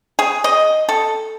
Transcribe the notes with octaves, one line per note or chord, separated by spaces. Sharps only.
G#4
D#5
A4